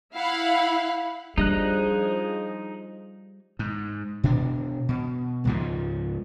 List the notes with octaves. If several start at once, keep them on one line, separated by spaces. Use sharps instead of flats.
E4 F5 F#5 B5
F3 G3 D4 D#4 G#4 D#5 F#6
G#2
B2 D4
B2
C#2 G#2 F3